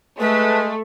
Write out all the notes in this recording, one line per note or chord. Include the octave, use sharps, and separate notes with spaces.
G#3 A3 B4